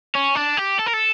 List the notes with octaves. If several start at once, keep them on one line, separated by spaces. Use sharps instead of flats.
C#4
D4
G4
A4
A#4
A4